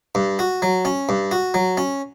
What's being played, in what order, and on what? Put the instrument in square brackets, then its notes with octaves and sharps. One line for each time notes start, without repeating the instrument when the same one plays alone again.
[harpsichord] G2
F#4
F#3
C#4
G2
F#4
F#3
C#4